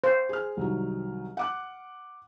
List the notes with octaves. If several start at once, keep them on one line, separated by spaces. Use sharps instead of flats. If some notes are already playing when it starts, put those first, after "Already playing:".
C5
G#4 F6
C2 D#3 F#3
F#5 D6 F#6